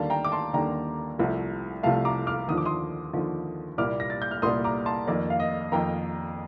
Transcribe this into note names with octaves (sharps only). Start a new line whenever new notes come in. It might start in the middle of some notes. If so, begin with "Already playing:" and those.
Already playing: D#2 D3 G3 A#3 F5 A5
G5 A#5
D6
A5 C6
D#2 D3 G3 A#3 G5 A#5
C2 C3 F3 A3
C2 C3 F3 A3 F5 A5
A#5 D6
D6 F6
D#2 D3 F3 D#6
D6
C6 D#6
D#2 D3 F3
C2 A#2 G3 A#3 D6 F6
A#6
A6
G6
F6
C2 A#2 G3 A#3 C6 D#6
A#5 D6
A5 C6
F2 D#3 A#3 D5
F5
D#5
F2 D#3 A#3 G5 A#5